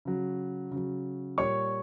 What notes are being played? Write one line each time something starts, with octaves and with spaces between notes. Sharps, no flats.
C#3 F#3
C#3 F#3
A#2 G3 C#5 C#6